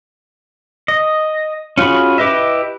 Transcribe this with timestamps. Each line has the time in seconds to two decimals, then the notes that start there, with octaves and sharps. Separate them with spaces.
0.88 D#5
1.78 C#4 F4 F#4 G#4 B5
2.18 E4 G4 B4 D#5 E5